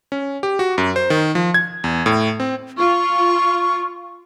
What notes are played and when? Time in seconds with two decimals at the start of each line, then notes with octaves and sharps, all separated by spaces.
0.12 C#4
0.43 G4
0.59 F#4
0.78 F#2
0.96 C5
1.10 D#3
1.35 F3
1.54 G#6
1.84 E2
2.06 A2
2.40 C4
2.78 F4 C#6